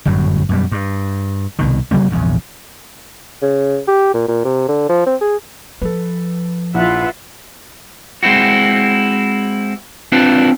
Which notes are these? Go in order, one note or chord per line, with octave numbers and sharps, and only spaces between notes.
G1 F#2 A2 F#3
F#2 B2 G3
G2
C2 B2 D#3
C3 F#3 A#3 C4
A#1 E2 G#2 C#3
C#3
G4
A#2
A#2
C3
D3
F3
C4
G#4
F3 A4 B4
A#1 E4 F4 B4 E5 F#5
G#3 C4 E4 F#4
C4 D4 E4 F4 B4 D5